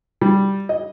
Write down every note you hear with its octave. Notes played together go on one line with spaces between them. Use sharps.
G3
D#5